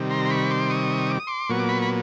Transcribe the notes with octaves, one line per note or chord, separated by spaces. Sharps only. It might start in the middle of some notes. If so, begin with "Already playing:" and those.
Already playing: C3 D#3 G3
A#5 C6
C6
B5 C#6
C6 D6
C#6 D#6
D6
D#6
C6 D6
A#2 F#3 B3 C#6
D6
B5 C#6
B5